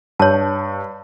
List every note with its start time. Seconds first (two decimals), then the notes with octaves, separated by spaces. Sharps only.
0.20 G2 C#5 A5